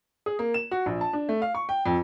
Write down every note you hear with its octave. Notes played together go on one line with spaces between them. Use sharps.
G#4
A#3
E7
F#4
A#1
A5
D4
A3
F5
C#6
G5
F2